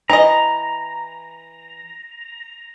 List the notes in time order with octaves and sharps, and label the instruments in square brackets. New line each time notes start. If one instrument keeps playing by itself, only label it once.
[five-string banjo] E3 D#5 [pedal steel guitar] A#5